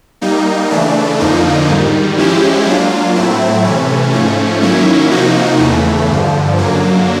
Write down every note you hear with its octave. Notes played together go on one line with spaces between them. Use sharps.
G3 A#3 D#4
C#3 E3 A3 D4
F2 D3 F3 A#3 D#4
G#2 D#3 G3
F3 G#3 C#4 E4 G4
F#3 A#3 D4 F4
A2 F#3 A3 C4 E4
C3 E3 A3 C#4
G#2 F3 A3 C#4
D#3 F#3 A#3 C#4 E4
C3 F3 A#3 D#4 F#4
E2 C#3 E3 A3
G2 D3 F3
F#2 D3 F#3 A#3